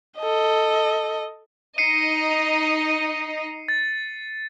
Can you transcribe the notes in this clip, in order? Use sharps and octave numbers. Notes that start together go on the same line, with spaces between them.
A4 D#5
D#4 D#5 C7 C#7 D#7
A6